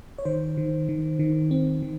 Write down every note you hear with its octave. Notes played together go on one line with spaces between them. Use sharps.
C#5
D#3 C5
D#3
D#3
D#3
C4
D#3